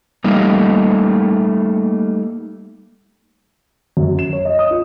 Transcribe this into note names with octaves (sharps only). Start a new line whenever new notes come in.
G3 A3 A#3 D#4
F#2
E7
C#5
D#5
D#6
F4